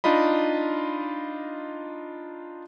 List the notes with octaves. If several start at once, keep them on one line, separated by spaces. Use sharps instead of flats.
D4 D#4 F4 D#5 B5